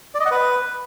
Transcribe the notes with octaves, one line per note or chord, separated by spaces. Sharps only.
D5
D#5
F#5
B4